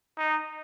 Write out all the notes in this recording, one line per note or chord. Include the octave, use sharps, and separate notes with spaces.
D#4